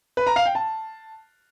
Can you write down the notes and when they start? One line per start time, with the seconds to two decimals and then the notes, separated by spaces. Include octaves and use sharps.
0.17 B4
0.27 A#5
0.36 F5
0.46 G5
0.55 A5